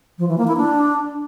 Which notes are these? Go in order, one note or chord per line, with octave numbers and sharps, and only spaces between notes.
F3
E3
A#3
E4
D4